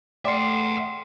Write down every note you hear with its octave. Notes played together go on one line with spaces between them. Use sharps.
A3 D5 E5 F#5 G5 C6 C7